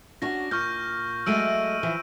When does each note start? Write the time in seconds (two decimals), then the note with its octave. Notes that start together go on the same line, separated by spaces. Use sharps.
0.22 C#4 D4 F#4 A#6
0.51 A#2 C#6 F6 G6
1.26 F#3 G#3 A3 E6 D7 D#7
1.83 E3 F3